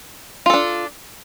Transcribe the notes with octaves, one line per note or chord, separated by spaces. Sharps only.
D4 F4 A4